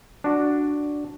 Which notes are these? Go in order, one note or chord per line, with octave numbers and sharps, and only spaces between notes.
D4 F#4